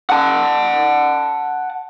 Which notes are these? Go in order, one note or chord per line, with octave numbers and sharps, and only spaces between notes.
F#5 A5